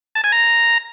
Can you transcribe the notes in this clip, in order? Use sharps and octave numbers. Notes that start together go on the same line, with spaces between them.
A5
G#5
A#5